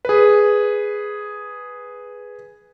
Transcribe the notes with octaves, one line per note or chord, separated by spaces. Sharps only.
G#4 B4